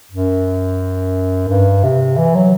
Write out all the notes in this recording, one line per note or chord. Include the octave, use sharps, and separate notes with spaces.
F#2
G2
C3
E3
F#3